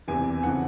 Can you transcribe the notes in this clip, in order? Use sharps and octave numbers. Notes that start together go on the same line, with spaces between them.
E2 C3 E3 G#5
F2 C#3 E3 F#5